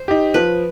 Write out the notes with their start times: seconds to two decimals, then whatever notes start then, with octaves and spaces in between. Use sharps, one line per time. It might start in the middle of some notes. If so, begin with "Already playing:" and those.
Already playing: C5
0.08 D#4 G4
0.34 F3 B4